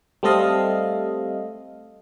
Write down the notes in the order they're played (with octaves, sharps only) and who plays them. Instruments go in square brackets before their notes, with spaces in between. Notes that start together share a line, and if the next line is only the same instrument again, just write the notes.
[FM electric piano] G3 A3 C4 A4 D#5 F5